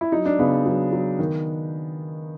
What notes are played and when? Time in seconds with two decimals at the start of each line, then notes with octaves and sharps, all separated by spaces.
0.01 E4
0.12 F#3 D#4
0.26 D4
0.39 C#3 B3
0.66 F#3 B3
0.92 F#3
1.19 D#3